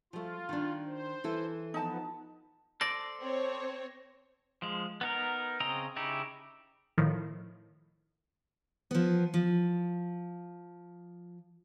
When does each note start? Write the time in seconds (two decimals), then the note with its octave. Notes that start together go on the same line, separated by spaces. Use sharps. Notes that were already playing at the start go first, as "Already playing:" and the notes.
0.13 F3 A3 F4
0.49 D#3 D4
0.86 C5
1.24 E3 E4 A4
1.74 F3 B3 D#4 A5
2.81 A4 C5 D5 A#6
3.19 C4 C#5
4.62 F3 G#3
5.01 B3 D#4 A#4
5.60 C#3 C4 D#5 G5 A#5
5.96 C#3 D#4 E4 G4
6.98 A2 D#3 F3
8.91 F3 B3
9.34 F3